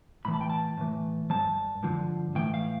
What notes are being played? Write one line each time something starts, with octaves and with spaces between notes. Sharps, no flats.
A2 E3 B5
A5
G5
A5
A2 E3
G2 F3 A5
G2 D3 F3
A2 E3 G5
F5